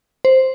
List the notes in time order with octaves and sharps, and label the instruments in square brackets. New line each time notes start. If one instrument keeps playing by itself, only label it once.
[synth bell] C5